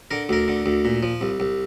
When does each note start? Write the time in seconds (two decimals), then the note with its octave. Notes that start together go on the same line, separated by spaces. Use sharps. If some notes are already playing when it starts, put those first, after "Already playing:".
0.11 D3 A#4
0.29 D2 A#4
0.48 D3
0.66 D2
0.85 A#2
1.03 F3
1.21 C2
1.40 C2